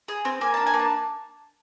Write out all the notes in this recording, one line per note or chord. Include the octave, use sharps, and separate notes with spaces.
G#4
C4
A#3 G#5
D4 A5
G#5
A#3
A5